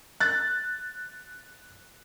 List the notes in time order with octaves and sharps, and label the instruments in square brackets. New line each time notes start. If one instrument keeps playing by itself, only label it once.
[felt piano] F#6 A6